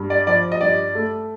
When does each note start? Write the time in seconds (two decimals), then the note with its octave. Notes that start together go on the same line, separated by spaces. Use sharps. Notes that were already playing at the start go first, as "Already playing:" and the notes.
Already playing: G2
0.10 D5
0.27 F3 D5
0.52 D#5
0.61 G2 D5
0.95 A3